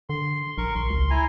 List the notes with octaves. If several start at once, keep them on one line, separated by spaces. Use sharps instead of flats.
D3 C6
A#1 A#4 C#6
A#1 C6
C#2
E4 G#5 A#5